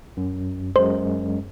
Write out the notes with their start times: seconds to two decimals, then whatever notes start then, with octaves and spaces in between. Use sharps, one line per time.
0.17 F#2
0.76 F#2 G#3 C5